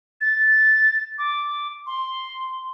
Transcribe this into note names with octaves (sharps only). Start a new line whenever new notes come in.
A6
D6
C6